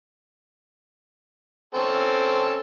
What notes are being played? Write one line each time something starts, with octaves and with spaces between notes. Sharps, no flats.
C4 C#4 A4